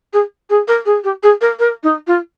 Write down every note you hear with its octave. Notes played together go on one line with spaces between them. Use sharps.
G#4
G#4
A#4
G#4
G4
G#4
A#4
A#4
D#4
F4